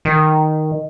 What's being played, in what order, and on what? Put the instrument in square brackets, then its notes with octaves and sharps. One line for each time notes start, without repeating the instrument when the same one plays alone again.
[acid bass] D#3